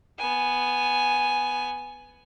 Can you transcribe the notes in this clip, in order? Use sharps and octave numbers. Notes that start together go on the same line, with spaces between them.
B3 G#5